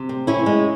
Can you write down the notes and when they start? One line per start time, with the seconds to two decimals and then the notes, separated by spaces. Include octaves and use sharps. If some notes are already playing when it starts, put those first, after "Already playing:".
Already playing: C3
0.09 C4
0.27 E3 C#4 E4
0.46 G#3